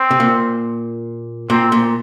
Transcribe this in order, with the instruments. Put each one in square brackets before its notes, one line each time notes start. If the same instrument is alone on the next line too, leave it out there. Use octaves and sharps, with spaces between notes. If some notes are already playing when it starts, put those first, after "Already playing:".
Already playing: [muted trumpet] C4
[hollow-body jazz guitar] C3
A#2
[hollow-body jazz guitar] A#2 [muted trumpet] C4
[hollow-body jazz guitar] A#2